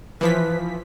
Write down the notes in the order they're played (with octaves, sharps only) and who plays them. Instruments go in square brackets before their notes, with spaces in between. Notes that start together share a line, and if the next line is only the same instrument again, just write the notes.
[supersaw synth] E3 F3 B6 [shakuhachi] B4